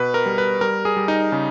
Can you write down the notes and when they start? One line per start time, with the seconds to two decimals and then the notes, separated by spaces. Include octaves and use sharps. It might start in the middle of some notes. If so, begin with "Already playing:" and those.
Already playing: B2 B4
0.14 A#4
0.26 G3
0.38 B4
0.61 G3 A#4
0.85 G#4
0.97 G3
1.08 D#4
1.32 C#3